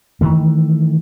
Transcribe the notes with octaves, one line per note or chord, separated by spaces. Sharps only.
D#3 E3 A3